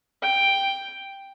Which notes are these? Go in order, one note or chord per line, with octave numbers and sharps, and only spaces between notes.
G5